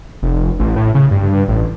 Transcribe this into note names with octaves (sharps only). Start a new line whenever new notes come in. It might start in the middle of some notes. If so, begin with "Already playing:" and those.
F1
A1
A2
C#3
G2
A1